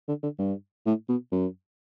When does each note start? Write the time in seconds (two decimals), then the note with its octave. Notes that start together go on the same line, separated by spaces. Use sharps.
0.08 D3
0.23 D3
0.38 G2
0.86 A2
1.09 B2
1.32 F#2